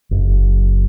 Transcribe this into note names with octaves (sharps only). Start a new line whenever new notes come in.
F#1